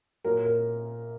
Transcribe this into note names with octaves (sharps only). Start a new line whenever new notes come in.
A#2 F#3 A#4
A#4